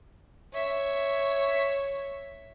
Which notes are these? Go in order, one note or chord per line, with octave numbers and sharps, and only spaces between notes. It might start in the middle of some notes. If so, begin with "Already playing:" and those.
C#5 E5